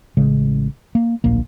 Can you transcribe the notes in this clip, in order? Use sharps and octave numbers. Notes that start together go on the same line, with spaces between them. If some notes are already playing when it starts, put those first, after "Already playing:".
A1 C#3 G#3
A#3
D1 A#1 A#3